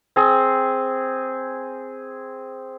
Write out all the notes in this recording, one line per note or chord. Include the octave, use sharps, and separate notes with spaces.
C4 G#4